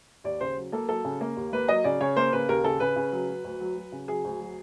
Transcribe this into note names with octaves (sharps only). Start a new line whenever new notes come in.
D#2 D5
C#3 C5
F#3
A#3 A4
F#3 A4
C#3
A#3
D#2
A#3 B4
F#3 D#5
C#3 D5
C#3 C#5
A#3 C5
C#3 B4
D#2 A#4
C#3 A4
C#3 B4
C#3
F#3
F#3
D2
F#3
F#3
C#3
F#3 G#4
D2
F#3